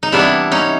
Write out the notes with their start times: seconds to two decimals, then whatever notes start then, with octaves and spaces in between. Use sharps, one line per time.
0.03 D#4
0.12 C3 E3 G3 B3 D4 E4
0.52 C#4 D#4